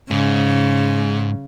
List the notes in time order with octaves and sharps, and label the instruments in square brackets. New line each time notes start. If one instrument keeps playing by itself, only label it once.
[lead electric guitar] G#2 [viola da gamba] C#3